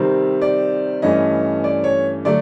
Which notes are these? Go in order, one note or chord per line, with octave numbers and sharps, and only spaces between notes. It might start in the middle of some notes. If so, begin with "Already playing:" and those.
Already playing: C3 D#3 G3 C4
D5
G2 E3 A3 C#4 D#5
D5
C#5
D3 F#3 A3 D5